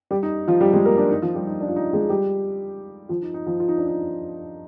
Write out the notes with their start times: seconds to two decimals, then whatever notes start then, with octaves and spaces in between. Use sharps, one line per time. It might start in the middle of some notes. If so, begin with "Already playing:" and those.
0.11 G3 G4
0.23 D#4
0.48 F3 F4
0.61 G3 G4
0.73 G#3 G#4
0.85 A#3 A#4
0.98 D4
1.11 D#4
1.22 F3 F4
1.35 G3 G4
1.47 D#4
1.61 D4
1.68 F4
1.76 D#4
1.93 G#3 G#4
2.09 G3 G4
3.09 F3 F4
3.22 D#4
3.34 D#4
3.47 F3 F4
3.60 F4
3.68 D#4
3.78 D4
3.88 D#4